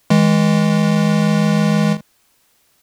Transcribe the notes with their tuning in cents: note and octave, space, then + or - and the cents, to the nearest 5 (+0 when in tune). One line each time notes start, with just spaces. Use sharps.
E3 -35 G#3 +0